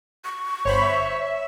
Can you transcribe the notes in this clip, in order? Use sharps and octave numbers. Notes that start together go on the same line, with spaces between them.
C#6
G1 C5 C#5 B5
E5